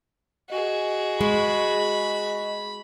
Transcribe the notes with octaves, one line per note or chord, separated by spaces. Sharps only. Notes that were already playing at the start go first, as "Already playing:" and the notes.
F#4 G#4 D#5
G#3 D#5 B5 C#6